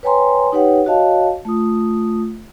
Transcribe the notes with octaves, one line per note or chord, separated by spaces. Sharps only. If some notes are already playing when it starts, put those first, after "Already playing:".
B4 C#5 G5 G#5 A#5 C6
D#4 G4 B4 C#5 F#5 G5
F#4 C#5 D#5 F5 A5
A3 F4 D#6